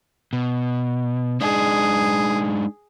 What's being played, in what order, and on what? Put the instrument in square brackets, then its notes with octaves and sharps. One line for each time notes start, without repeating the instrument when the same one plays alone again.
[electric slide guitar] B2
[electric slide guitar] G#3 D4 D#4 [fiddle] G#4